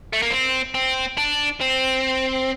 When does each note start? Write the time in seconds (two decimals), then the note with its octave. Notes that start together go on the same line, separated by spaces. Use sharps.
0.13 A3
0.22 A#3
0.31 C4
0.75 C4
1.17 D4
1.61 C4